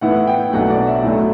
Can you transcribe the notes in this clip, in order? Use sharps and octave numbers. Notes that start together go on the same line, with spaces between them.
A2 E3 B3 E4 F#5
G5
B1 B2 F#3 A3 D4 F#5
D5
E5
B1 A2 F#3 A3